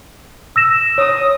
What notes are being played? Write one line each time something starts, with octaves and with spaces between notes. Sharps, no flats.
E6 A#6 E7
C#5 D#6